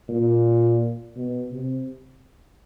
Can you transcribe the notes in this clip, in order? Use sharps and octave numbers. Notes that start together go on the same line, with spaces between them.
A#2
B2
C3